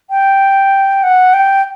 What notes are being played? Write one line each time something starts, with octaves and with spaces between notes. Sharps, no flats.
G5
F#5
G5